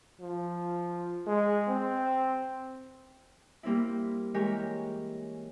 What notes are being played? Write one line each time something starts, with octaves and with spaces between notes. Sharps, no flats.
F3
G#3
C4
G3 A#3 C4 E4
E3 G#3 G4 A#4 C#5